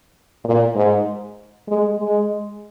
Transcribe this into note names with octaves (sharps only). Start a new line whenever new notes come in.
A#2
G#2
G#3
G#3